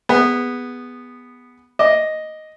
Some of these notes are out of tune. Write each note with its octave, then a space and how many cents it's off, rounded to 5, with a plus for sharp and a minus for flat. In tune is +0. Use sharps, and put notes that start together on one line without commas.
B3 +0 G#4 -25
D#5 +0 D6 +0